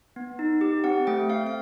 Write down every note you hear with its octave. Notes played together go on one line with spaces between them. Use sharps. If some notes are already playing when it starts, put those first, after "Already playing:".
B3
D#4
G4
C4 F#5
A3 G5
C4 F5
F5